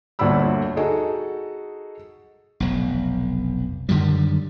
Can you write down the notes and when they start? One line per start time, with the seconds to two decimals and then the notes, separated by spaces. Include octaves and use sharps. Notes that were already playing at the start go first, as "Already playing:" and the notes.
0.19 G1 D2 A#2 D5 B5 E6
0.77 D#4 F#4 G#4 A4
2.60 F1 B1
3.89 F#2 D3 D#3 G3